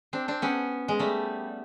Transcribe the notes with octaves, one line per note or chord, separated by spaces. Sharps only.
C4 D4
C4 D4
B3 C#4
G#3
G3 A3